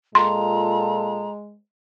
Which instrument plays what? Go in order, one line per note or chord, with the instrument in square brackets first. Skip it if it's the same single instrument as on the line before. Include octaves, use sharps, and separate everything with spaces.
[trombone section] A#2 F4 A4 [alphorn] G#3 [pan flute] A#5 [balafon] C6